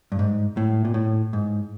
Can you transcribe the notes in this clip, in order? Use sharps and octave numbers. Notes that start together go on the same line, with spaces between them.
G2
G#2
A2
A#2
A2
G#2